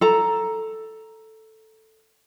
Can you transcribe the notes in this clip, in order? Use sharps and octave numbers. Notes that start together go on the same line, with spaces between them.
A4 A#5